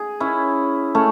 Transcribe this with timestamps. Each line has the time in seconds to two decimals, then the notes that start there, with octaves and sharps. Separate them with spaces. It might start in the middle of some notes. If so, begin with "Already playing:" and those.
Already playing: G#4
0.20 C#4 E4
0.95 A3 C#4